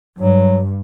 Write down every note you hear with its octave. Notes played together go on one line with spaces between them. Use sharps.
G2 F#3